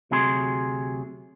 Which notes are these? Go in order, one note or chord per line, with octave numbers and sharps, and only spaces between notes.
D2 C3 F#3 G#4 B5 C6